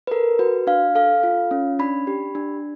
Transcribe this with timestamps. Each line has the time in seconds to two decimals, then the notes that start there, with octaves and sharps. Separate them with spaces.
0.07 B4
0.11 A4 A#4
0.39 F#4 B4
0.67 D4 F5
0.95 A4 F5
1.23 F4
1.51 C#4
1.79 D4 B5
2.07 G4
2.35 D4